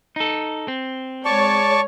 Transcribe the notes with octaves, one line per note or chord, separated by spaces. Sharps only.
D#4 A4
C4
G#3 C#5 D5 A5 C#6